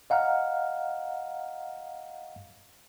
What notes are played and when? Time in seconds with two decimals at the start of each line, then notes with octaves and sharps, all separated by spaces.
0.10 D#5 F5 F#5 A#5 F6